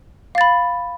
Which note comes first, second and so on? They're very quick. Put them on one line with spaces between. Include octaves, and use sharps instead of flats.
F5 A6 B5